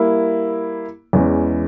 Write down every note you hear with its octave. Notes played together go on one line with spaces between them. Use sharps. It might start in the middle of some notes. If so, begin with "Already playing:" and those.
Already playing: G3 A#3 E4
E2 E3 G#3 C#4